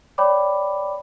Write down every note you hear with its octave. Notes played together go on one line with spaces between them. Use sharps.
C#5 D5 G5 B5 D6